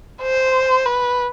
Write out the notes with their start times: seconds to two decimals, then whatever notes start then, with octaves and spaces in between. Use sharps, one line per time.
0.23 C5
0.86 B4